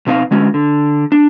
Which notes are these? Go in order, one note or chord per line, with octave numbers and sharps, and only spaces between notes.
B2 C4 D#4 C5 F5
D3 G#3 C#4 F#4
D3
D4